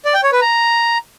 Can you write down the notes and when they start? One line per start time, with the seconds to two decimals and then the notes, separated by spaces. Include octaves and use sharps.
0.05 D5
0.14 G5
0.23 C#5
0.32 B4
0.41 A#5